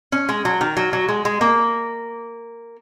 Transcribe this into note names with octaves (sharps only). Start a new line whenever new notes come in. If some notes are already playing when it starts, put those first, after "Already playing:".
C#4
G#3
F#3
D#3
F#3
F#3
G#3
G#3
A#3